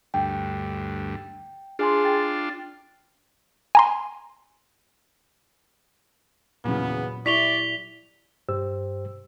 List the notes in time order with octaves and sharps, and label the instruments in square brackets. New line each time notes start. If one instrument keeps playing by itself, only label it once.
[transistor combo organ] D2 G2 [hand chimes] G5
[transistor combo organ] D4 F4 [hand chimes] G#4 G#5 C6
[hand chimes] G5 A6
[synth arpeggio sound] G#5 A#5 C6
[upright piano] E2 C#3 [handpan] A#2 F#3 [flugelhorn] B3
[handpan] E4 G4 [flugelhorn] D5 [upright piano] C#6 [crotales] B6 F7 G7
[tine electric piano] G2 G4 C5 E6